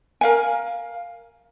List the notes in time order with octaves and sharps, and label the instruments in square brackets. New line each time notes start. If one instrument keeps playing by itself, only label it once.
[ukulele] A#4 F5 G#5